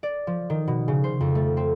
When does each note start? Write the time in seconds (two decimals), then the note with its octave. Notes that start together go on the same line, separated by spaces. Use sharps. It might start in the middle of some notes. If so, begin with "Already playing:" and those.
0.03 D5
0.27 F3
0.50 D#3
0.68 B2
0.88 C#3
1.04 C5
1.21 F2
1.35 A3
1.57 C4